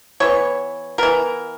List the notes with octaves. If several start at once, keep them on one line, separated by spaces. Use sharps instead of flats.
E3 B3 C#5
E3 B3 A#4